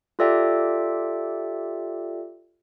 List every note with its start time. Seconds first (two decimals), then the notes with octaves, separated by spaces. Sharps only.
0.19 F4 G4 A4 D5 E5 G5